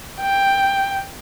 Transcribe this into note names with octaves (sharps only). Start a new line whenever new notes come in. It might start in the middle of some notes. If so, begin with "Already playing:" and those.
G5